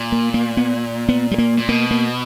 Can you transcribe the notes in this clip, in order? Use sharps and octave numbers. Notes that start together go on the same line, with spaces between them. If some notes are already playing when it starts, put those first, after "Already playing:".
Already playing: A#2
A#3
A#3
B3
B3
G3
A#3
A#2
B2 A#3
A#3